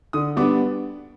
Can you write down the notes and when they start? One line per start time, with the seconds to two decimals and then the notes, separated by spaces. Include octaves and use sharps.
0.13 D3 D#6
0.36 G3 B3 D4 D6